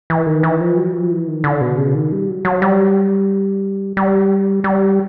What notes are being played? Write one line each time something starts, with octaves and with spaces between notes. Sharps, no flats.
E3
D#3
E3
F3
F#3
F3
E3
D#3
D3
B2
C#3
D#3
G3
F#3
F#3
G3
G3
G3